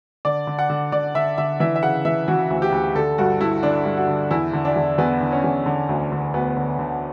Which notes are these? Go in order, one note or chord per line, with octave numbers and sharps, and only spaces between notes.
D3 D5
D3
F#5
D3
D3 D5
D3 E5
D3 E5
E3 E5
E5
C#3 F#5
E3 E5
E3 F#4
D2
G4
D2
D3 A4
G2 F#4
G2 E4
D3 D4
G2
F#4
D3
E2 E4
D3
D4
E2
E2 B3
D3
C#4
E2
D3
D2
D3
D2 B3
D3
D3